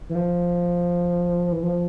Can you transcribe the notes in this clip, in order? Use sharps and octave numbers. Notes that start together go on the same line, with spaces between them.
E3
F3
E3
F3